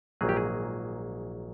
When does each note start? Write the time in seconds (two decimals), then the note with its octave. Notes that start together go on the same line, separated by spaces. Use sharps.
0.21 A#1 G#2 D#3 F#3 A#3 G#4
0.29 G4
0.37 G#4